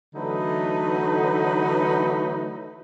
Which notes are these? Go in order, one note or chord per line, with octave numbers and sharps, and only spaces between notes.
D3 E3 F#3 A3 D#4 B4